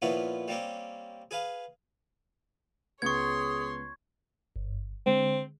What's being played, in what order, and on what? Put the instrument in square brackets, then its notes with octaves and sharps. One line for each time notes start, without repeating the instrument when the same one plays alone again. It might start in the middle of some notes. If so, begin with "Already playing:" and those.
[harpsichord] A#2 F3 B3 C#4 E4 F4
G3 A#3 C4 C#4
G#4 B4 F5
[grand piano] C#2 B3 C#7 [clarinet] G#4 [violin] C#5 C6 [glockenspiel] C#6 G#6
[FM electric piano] G1
[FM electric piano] D3 G#3 [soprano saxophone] C4